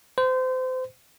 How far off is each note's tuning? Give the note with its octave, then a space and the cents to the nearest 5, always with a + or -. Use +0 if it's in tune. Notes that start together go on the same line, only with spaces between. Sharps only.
C5 -30